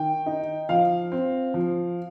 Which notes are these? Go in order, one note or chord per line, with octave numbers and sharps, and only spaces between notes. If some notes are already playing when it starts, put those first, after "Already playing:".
Already playing: D#3 G5
D#4
F3 F5
C4
F3